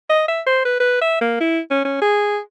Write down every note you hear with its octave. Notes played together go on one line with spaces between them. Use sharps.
D#5
E5
C5
B4
B4
E5
A#3
E4
C#4
C#4
G#4